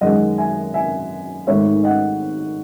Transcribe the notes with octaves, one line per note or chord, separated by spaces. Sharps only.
F#2 D#3 G#3 D#5 F#5
E5 G#5
E5 G#5
G#1 G#2 D#3 A3 C#5 E5
D#5 F#5